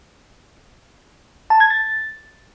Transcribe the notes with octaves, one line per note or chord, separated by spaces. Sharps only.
A5
G#6
A6